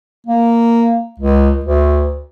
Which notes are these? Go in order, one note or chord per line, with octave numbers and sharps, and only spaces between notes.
A#3
C#2
D2